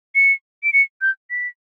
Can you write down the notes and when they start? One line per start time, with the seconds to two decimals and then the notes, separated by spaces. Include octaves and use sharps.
0.15 C#7
0.63 D7
0.73 C#7
1.01 G6
1.30 B6